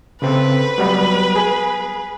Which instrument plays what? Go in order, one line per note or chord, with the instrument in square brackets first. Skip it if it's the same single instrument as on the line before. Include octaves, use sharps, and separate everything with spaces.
[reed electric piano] C#3 C4 A4 [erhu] B4
[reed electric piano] F#3 G3 B3
G#4